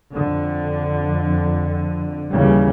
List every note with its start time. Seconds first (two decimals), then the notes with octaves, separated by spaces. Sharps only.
0.13 F2 D3
2.30 D#2 C#3 E3 G3